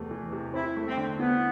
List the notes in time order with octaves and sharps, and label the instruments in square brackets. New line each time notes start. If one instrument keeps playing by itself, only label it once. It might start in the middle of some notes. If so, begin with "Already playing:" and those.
Already playing: [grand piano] E2 C3 E3 A3
E3
C3
[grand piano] C4 [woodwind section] E4
[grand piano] A3
[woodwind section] C4
[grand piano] D3
[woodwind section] B3 [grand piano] E4